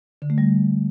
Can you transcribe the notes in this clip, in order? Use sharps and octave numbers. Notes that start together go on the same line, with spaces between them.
D3
A3
G3